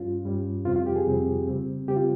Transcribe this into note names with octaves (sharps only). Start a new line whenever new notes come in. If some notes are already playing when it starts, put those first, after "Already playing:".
Already playing: G2 G3 C#4 F4
G2 G3 C#4
F2 C3 G3 C4 F4
F4
G4
G#4
F2 C3 G3 C4
C#3 G3 C4
C#3 G3 C4 G4
F4